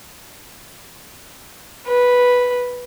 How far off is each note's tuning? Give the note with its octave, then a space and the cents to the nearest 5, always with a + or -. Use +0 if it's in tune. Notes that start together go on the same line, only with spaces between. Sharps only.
B4 -5